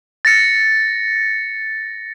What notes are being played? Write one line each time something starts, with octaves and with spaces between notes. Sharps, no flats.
A6 A#6 C#7